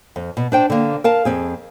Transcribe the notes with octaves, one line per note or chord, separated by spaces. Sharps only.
F2
B2
D4 C5 G5
D3 A#3
A#4 F5 A5
F2 C4 G#4